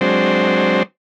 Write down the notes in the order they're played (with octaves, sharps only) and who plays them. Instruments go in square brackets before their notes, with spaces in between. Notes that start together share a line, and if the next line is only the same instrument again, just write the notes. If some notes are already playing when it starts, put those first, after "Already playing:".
[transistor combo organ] F#3 G#3 C4 D4 C5